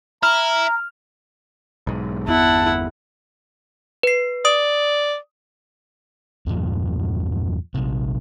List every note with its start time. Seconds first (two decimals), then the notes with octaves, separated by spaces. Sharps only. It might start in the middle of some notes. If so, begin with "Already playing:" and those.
0.23 E4 A#5 F6
1.87 B1 G#2
2.27 G1 E2 B3 E4 F#5 A5
4.03 B4 C7
4.45 D5 D#6
6.46 E2 G2 A#2 F3
7.75 A#1 C3